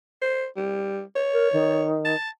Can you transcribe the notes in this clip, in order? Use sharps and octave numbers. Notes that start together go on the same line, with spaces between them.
C5
G3
C#5
A#4
D#3
A5